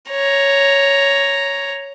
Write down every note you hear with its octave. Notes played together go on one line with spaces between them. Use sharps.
C#5 A#5